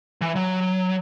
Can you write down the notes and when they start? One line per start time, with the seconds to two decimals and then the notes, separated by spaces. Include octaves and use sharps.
0.21 E3
0.36 F#3